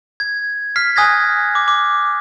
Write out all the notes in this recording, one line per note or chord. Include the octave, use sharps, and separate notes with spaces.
G#6
F6 B6 C7
G#5 D#6 F#6 G#6 A#6 B6
D6
D6